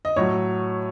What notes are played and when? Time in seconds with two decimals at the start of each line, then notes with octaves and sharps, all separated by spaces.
0.05 D#5
0.16 A2 F#3 C#5